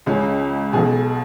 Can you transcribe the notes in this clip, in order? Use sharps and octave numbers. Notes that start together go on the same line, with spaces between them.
C#2 C#3 C#4
B1 B2 G#4